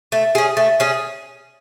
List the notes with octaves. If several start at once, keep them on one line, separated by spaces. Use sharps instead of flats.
A3
C#4 G#4
A3
C#4 G#4